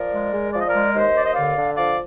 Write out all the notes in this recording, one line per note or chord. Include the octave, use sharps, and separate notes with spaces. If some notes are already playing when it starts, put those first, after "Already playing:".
Already playing: F3 A#4 D5
G#3
G#3
F3 D5
D#5
A#4 D5
G#3
D#2 C5 D#5
D#2 D5
D#5
D3 D5 F5
D3
F3 D5 F5